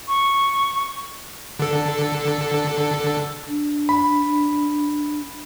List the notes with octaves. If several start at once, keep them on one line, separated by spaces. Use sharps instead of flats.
C#6
D3 A4
D4
B5